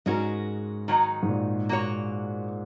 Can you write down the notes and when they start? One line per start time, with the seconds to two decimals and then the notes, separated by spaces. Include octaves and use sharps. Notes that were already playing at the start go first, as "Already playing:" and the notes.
0.06 G#2 G#3 C#4 F#4 A#4
0.88 D#3 F#3 D#4
1.23 G#2
1.29 A#2
1.69 A#3 F#4 C#5